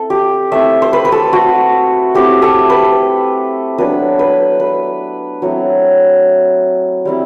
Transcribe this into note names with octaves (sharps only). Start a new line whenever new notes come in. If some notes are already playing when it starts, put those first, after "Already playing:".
Already playing: A3 C4 E4 A4
G4
A3 C4 E4 E5
C5
B4
B4
A4
F#4
A3 C4 E4 G4
A4
B4
F#3 B3 D4 B4
B4
B4
F#3 A3 C4 E4
G3 C4 E4